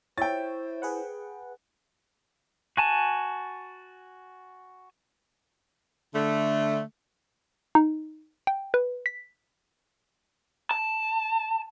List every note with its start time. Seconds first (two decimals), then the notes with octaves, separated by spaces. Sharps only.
0.18 E4 C5 C#5 E5 G5 A6
0.82 G#4 B4 F#5
2.77 F#4 G#5 A5
6.14 D3 A3
7.75 D#4
8.47 G5
8.74 B4
9.06 B6
10.71 A5